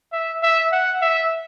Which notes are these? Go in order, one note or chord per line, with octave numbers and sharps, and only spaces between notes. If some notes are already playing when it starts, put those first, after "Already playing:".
E5
E5
F#5
E5